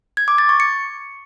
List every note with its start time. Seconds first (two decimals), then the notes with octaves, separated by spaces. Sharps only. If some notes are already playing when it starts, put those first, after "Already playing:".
0.17 G#6
0.28 D6
0.38 A6
0.49 C#6
0.60 C#7